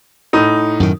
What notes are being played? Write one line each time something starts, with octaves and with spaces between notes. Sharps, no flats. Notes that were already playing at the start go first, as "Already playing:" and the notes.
A2 D#4
F#2 A2 D#3